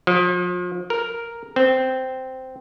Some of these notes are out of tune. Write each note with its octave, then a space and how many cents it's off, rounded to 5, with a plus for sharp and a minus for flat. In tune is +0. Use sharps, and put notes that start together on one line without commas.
F3 +35
A#4 +0
C4 -10